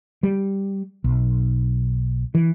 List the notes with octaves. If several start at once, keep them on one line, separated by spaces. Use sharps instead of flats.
G3
B1
E3